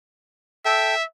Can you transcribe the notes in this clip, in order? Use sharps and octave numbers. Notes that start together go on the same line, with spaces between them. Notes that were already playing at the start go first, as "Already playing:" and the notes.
A4 E5 G5